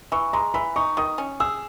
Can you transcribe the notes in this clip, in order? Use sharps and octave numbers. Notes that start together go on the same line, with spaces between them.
E3 C#6
G#3 A#5
E3 B5
D#4 C#6
D#3 D#6
C#4
G#4 E6